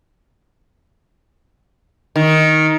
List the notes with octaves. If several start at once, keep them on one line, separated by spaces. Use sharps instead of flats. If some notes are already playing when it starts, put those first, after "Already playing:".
D#3